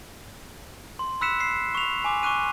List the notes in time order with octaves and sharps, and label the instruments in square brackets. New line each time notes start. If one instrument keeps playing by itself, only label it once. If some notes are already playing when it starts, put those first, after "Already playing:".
[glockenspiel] C6
B5 E6 F#6 B6 C#7 E7
C7
C#6 F7
G#5 D6
C#6 D6 F#6 D#7